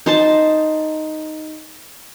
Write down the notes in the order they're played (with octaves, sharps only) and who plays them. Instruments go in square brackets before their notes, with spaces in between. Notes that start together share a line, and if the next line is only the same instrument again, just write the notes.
[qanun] D#4 C5 A5